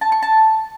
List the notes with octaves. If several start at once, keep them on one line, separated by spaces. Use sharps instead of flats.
A5
C#6
A5